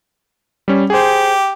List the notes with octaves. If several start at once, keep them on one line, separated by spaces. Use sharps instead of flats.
G3 C#4
G4 G#4 C5